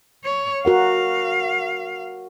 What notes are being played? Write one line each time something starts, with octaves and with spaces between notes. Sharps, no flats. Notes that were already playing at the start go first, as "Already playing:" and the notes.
C#5
F#4 A#4 F5 F#5